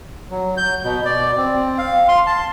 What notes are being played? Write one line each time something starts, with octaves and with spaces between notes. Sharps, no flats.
F#3
G6
B2
D5
C4
F5
C6
A5